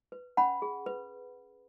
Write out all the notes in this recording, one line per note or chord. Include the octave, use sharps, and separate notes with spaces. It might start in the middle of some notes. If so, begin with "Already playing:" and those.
B4
C#4 F#5 B5
G#4
B4